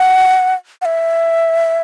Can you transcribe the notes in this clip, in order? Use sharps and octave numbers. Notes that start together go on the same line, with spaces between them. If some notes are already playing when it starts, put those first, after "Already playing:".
Already playing: F#5
F#5
E5